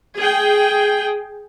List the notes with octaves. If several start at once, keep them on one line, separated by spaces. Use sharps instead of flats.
G#4 G5